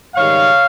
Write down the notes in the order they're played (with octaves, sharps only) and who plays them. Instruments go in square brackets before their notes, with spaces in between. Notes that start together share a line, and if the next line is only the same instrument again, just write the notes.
[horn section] G#2 D#3 G3 C#5 F5